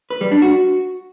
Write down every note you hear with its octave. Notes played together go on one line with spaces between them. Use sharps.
B4
G3
D4
F#4